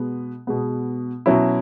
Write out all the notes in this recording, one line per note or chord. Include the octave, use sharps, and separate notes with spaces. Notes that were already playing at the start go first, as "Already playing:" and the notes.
Already playing: B2 G#3 B3
B2 G#3 B3
B2 F#3 C#4 E4